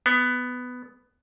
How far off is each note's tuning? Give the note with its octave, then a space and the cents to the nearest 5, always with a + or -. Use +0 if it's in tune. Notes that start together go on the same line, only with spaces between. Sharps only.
B3 +10